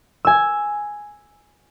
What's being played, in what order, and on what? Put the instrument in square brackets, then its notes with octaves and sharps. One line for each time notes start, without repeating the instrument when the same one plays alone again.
[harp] G#5 E6